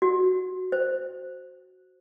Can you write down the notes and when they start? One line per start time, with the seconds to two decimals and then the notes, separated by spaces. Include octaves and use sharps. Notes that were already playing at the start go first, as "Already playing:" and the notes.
0.02 F#4
0.72 C5